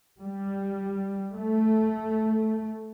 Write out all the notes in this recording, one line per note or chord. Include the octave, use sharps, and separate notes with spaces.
G3
A3